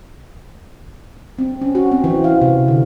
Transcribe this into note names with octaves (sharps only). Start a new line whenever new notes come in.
C4
C#4
F#4
C4
E3
F5
C3
D3